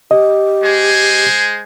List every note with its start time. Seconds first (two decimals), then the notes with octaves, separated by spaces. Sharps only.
0.11 G4 D#5
0.63 G#3 C5 G#5